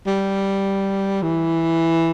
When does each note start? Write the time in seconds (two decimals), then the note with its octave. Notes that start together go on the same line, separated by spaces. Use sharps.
0.07 G3
1.23 E3